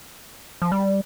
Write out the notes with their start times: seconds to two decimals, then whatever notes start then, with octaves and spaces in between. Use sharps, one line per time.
0.62 F3
0.72 G3